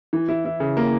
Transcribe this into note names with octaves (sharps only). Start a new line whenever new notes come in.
E3
E4
E4
C#3
A#3